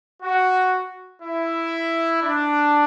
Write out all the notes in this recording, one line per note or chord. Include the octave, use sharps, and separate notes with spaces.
F#4
E4
D4